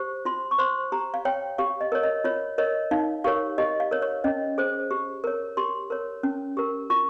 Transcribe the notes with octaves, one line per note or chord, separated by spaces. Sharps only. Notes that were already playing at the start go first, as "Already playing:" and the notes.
Already playing: G4 C5
F4 C6
C#6
C5 C6
G4 A#5
F5
C#5 G5
G4 F5
D#5
A#4 C#5
D#5
F4 C#5
A#4 C#5 D#5
D#4 F5
G4 A#4 C#5 F5
G4 D#5
F5
A#4 C#5
C#5
C#4 D#5
G#4 C5
G4
A#4 C#5
G4 C6
A#4 C#5
C#4
G4 A#4
F4 C#6